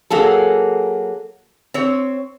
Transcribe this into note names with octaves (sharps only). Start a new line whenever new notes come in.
F#3 A#3 G#4 A4
C4 C#5